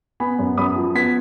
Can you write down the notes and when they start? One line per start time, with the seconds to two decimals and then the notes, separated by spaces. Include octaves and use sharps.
0.20 B3 G#5 B5
0.39 F#2
0.57 F#2 B5 D#6
0.76 F3
0.95 B3 G#6 B6